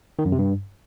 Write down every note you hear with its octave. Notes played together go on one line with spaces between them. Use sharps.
D#3
F#2
C3
G2